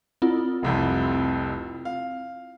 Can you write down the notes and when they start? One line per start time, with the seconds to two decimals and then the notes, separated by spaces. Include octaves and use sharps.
0.22 C4 E4 F4
0.63 F1 C2 F2
1.85 F5